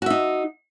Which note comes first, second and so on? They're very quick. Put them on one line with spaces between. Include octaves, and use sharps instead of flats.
F#4 E5 D#4